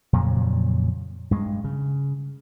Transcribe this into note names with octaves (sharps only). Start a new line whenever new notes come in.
F2 A#2 C#3 F#3
G2 G#3
C#3